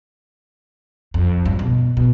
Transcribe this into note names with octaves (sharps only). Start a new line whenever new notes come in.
F2
G2
B2
B2